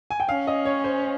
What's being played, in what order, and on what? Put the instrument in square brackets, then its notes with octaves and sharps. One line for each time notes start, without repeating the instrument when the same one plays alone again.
[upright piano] G#5
G5
[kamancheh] C#4 [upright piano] F5
[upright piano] D#5
C#5
C5